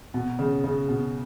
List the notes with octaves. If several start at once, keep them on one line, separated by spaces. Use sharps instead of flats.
B2
C#3
C#3
B2